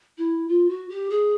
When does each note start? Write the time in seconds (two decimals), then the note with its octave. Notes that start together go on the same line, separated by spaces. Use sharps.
0.18 E4
0.48 F4
0.69 F#4
0.89 G4
1.10 G#4